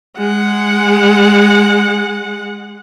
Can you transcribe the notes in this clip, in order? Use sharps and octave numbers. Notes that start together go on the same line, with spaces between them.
G#3 F#5